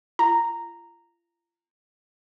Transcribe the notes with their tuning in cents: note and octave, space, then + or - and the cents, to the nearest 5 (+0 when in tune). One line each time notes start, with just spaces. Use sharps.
F4 -35 A#5 -5